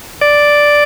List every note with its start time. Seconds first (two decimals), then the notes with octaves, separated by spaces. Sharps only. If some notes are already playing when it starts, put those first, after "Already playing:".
0.21 D5